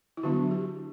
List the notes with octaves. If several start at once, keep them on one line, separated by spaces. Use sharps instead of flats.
E4
D3 F#3 B3 D4 F#4
G4